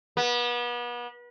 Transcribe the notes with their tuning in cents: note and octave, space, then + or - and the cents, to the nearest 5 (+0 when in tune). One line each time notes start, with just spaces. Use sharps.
B3 -35